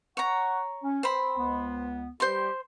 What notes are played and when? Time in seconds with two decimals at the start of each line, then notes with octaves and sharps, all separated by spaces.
0.17 C#5 F#5 A#5 C#6
0.83 C#4
1.03 C4 C5 B5
1.38 C#2 B3
2.20 G3 G4 C5 C6